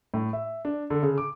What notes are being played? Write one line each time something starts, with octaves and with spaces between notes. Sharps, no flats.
A2
E5
D4
D3
C#3
D6